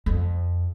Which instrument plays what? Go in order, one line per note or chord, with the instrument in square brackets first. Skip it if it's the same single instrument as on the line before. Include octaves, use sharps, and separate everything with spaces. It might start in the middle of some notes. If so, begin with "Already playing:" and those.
[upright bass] F2